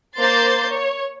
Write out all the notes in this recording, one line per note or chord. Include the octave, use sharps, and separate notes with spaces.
A#3 C5 G6 A6 C7
C#5